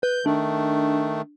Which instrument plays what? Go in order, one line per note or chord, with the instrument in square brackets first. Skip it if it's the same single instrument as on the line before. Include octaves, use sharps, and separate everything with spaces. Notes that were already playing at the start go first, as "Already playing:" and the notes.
[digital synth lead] B4 [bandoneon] G6
[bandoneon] D#3 A3 [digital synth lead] D4